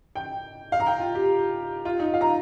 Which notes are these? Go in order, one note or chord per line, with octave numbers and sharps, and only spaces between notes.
G5
F5
A#5
G5
F4
G4
F4
D#4
F5
A#5